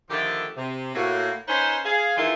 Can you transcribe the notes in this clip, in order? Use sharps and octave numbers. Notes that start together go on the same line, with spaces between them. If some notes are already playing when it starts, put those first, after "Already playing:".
D3 D#3 F3 A3 G4
C3
A2 A#3 F#4
C#4 D#4 B4 C5
G#4 F5
D#3 E3 G#3 E4 F4 A4